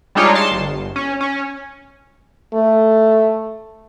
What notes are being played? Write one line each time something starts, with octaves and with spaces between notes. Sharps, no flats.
G3 G#3 D4 D#4 F4 C#5
A5 C6
G1
C#4
C#4
A3